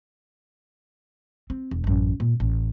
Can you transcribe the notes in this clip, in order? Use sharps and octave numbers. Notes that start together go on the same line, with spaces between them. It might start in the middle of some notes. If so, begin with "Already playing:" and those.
C4
E1
A1 F#2
A#2
A1